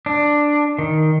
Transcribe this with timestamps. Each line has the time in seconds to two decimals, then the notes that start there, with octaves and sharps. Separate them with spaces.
0.06 D4
0.79 D#3